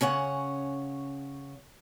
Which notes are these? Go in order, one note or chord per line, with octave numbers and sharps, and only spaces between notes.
C#3 C#4 C#5 F#5